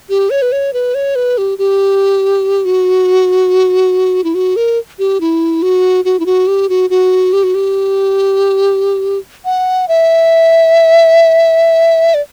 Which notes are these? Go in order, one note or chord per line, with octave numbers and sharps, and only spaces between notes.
G4
C#5
B4
C#5
B4
C#5
B4
G4
G4
F#4
E4
F#4
A#4
G4
E4
F#4
F#4
E4
F#4
G4
F#4
F#4
G4
F#4
G4
F#5
E5
D5